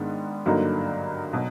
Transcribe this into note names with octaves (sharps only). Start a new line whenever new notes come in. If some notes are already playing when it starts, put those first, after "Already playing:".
Already playing: G#2 D#3 G#3 B3 D4
G2 D3 F#3 A#3 D#4
B2 F#3